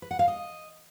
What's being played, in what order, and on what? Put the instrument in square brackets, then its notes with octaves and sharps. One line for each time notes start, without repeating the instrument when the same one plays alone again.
[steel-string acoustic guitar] B4
F#5
F5
D#5